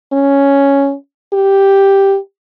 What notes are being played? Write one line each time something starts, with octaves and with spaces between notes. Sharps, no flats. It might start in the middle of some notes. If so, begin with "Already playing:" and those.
C#4
G4